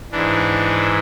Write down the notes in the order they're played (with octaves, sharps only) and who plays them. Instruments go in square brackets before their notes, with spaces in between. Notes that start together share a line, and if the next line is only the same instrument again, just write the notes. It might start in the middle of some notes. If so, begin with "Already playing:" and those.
[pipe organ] G#2 E3 D4